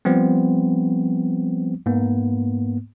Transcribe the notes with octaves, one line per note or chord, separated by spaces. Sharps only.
F3 G3 B3 C4
G#2 A#3 B3